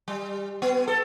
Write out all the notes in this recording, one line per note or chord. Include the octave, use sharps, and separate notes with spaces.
G3
B3
A4